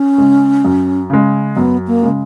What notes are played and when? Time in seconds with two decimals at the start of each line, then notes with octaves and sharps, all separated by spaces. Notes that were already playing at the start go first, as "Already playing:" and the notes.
Already playing: C#4
0.18 C#3 G#3
0.65 F#2
1.10 C#3 G#3
1.56 F#2 B3
1.87 A#3
2.03 C#3 G#3